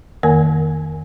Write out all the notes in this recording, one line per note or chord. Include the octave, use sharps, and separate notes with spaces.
F2 D#3 A#3 A#4 G#5